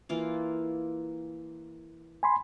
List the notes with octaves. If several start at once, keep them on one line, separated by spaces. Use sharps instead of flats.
E3 A#3 F4
G#5 B5 C6